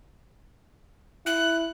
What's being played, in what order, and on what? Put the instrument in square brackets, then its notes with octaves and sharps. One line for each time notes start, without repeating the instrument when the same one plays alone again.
[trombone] E4 [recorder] F#6